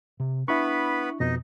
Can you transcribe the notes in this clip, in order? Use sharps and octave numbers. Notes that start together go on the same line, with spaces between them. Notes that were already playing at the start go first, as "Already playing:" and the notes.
C3
B3 D4 E4 B4 B5 C#6
F2 B2 D#4 D#5